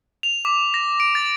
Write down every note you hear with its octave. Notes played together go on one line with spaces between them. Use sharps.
F7
D6
A#6
D7
A6